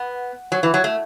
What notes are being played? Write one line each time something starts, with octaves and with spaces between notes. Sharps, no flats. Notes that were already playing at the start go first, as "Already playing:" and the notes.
Already playing: B3
F#3
E3
F#3
A3